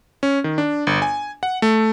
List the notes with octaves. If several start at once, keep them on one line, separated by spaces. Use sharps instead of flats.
C#4
D#3
D4
G1
G#5
F#5
A3